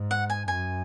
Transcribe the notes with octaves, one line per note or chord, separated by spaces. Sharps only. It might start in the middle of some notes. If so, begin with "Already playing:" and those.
Already playing: G#2
F#5
G#5
F#2 G#5